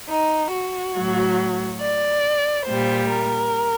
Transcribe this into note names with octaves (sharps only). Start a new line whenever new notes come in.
D#4
F#4
A2 F#3
D5
A#2 G3 C5
A#4